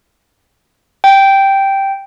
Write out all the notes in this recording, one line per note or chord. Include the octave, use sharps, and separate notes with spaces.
G5